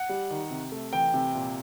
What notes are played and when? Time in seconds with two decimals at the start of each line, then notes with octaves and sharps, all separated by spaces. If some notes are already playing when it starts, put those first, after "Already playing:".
Already playing: F#5
0.09 G3
0.30 D#3
0.51 C3
0.72 A3
0.93 E3 G5
1.14 C3
1.35 A#2